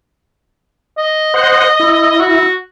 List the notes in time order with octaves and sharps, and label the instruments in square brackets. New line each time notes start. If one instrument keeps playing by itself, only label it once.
[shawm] D#5
[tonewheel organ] C5 F#5
E4
[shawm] F#4